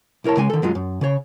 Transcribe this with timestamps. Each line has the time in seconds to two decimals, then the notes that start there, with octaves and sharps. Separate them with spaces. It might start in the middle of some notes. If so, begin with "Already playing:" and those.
0.24 B1 E4 A#4 C#5 A5
0.37 C#3 G#3 G#5
0.50 D#3 A4
0.62 F#2 F#3 G#3 F4
0.75 F#2
1.01 C#3 C#5